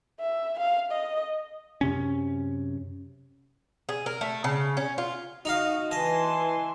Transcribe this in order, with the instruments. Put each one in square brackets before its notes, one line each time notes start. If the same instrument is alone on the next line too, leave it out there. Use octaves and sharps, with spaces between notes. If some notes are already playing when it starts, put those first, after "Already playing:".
[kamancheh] E5
F5
D#5
[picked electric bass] F#2 C3 C#4
[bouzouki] G#4
A#4
A3
C#3
C#4
F4
[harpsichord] D#4 F5 [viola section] F#4 D#5
[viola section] E3 G#5 C6 [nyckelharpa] B4 A5 [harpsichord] D#5